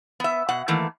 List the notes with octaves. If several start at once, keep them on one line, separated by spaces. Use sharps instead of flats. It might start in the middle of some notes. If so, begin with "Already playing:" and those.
B3 E5
B2 F#5
D#3 E3 A3 A#3